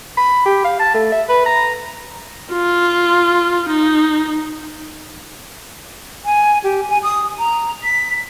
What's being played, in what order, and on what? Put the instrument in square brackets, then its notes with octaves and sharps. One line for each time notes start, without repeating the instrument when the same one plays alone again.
[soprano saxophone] B5
G4
F5
A5
A3
E5
B4
A#5
[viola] F4
D#4
[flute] G#5
G4
G#5
D#6
A#5
B6